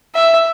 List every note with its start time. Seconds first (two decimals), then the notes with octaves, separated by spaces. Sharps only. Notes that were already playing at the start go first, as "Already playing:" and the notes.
0.15 E5